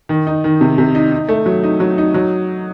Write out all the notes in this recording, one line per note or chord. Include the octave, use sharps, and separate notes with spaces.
D#3
D#4
D#3
C3
C3
D#4
D#4
A3
F#3
D#4
F#3
D#4
F#3